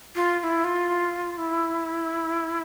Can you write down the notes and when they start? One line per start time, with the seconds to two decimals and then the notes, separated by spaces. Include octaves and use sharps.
0.16 F4
0.40 F4
0.43 E4
0.64 F4
1.38 E4